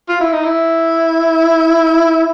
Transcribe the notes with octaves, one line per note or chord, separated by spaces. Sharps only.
F4
E4
D#4
E4